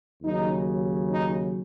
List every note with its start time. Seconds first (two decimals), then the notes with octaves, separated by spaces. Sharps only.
0.22 D#2 C#3 F#3 D#4
1.11 D#4